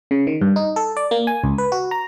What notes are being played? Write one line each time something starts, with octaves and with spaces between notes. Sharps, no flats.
C#3
D#3
G2
D#4
A4
D5
A#3
G#5
C#2
B4
F#4
A#5